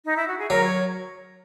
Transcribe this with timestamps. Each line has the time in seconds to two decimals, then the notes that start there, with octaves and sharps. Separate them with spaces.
0.05 D#4
0.17 E4
0.28 F#4
0.38 G#4
0.50 F#3 A#4
0.64 C#5